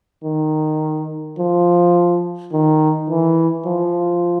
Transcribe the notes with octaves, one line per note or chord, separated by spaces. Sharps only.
D#3
F3
D#3
E3
F3